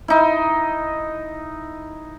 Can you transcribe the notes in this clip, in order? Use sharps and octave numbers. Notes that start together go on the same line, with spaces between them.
D#4 E4